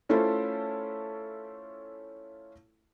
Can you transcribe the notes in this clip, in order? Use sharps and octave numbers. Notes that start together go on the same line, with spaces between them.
A3 C#4 E4 F4 A4 C5